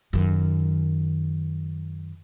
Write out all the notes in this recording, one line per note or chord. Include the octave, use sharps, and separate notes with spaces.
F#2 D#3